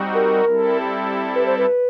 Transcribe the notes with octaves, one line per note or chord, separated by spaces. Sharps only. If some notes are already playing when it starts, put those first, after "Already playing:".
Already playing: G3 C4 D#4 F#4
A#4
G3 C4 E4 A4
B4
C5
B4